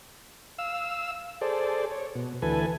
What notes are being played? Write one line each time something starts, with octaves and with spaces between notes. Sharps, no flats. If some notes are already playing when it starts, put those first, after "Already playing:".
F5 E6
G#4 A4 C5 D5
C#5
B2
D2 E3 A4 B4 G#5